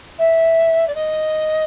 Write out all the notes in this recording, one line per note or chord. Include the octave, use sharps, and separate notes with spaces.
E5
D5
D#5